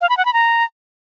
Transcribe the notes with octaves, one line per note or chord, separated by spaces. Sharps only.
F5
B5
F#5
B5
A#5